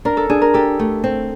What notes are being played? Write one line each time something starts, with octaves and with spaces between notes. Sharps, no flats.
D4 A#4
A4
D4 G#4
A#4
G4 A4
A3
C4